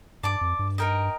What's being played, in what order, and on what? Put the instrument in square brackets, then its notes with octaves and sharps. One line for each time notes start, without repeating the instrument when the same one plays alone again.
[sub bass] G2 [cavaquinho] D5 A5 D6
[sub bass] F2
G2
[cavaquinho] D#4 A#4 D#5 G5